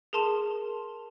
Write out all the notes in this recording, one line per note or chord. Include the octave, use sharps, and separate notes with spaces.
G#4 A#4 A5 C6 E7